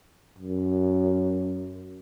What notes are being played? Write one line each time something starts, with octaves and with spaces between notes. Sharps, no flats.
F#2